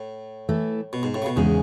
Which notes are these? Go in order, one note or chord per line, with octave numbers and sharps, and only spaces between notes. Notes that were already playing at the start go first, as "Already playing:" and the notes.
Already playing: A2
E3 A3 E4
B2
G#2
A2
C#3
B2
E2 G#2 C#3 G#3 C#4 G#4